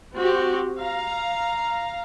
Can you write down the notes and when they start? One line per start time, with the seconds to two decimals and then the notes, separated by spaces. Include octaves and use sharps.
0.15 C4 F#4 G4
0.79 F5 A#5